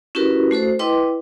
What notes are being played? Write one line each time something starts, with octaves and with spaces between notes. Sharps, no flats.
C#4 E4 F#4 G4 A#4 B4
A3 F#4 A4 C5
E4 B4 D#5 G5 C6 D6